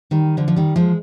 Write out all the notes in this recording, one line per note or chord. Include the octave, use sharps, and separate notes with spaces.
D#3 G3
D3 F3
F3
D#3 G3
F3 G#3